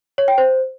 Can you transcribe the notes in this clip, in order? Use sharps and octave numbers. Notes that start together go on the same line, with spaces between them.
C#5
G5
C5